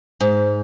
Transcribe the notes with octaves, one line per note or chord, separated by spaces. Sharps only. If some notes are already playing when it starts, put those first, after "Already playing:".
G#2